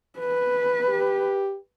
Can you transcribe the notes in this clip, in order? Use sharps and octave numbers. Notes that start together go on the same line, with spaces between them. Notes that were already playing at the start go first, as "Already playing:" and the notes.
B4
G4